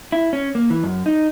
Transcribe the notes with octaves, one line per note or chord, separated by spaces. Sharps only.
E4
C#4
A#3
E3
F#2
D#4